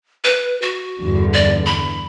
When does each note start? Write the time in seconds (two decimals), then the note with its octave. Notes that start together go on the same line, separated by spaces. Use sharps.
0.24 B4
0.62 F#4
1.00 E2 G2 D3
1.33 D5
1.66 B5